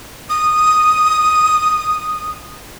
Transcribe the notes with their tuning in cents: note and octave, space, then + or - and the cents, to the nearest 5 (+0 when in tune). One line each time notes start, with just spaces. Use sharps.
D#6 +0